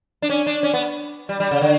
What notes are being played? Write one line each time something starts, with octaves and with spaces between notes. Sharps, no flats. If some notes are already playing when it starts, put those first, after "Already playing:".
D4
C#4
D4
C#4
B3
G3
G3
C#3
D3